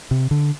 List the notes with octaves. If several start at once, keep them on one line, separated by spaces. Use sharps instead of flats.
C3
D3